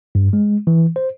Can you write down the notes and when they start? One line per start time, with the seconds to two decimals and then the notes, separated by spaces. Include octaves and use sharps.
0.15 G2
0.33 G#3
0.67 E3
0.96 C5